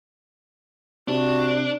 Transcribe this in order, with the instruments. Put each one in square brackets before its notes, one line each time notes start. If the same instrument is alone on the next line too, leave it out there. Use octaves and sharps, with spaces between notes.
[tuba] C3 [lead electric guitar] D4 [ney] F#4